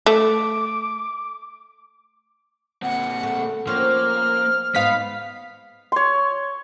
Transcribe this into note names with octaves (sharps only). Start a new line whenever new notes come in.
A3 D6
A#2 C4 F#5
A3
F3 A#3 C4 C#4 F6
G#2 B3 D#5 F5 B6
C#5 C6